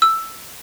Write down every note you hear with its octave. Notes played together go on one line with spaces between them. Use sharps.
E6